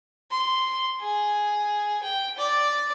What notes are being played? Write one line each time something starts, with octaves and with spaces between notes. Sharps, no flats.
C6
G#4
G5
D5